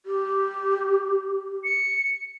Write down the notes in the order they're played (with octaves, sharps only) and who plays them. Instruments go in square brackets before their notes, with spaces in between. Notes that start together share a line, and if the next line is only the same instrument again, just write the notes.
[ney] G4
[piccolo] C#7